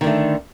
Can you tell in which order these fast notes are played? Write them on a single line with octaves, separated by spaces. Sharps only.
D#3 D3 A3